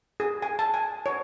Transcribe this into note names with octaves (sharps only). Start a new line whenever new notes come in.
G#4
G#5
A5
G#5
C#5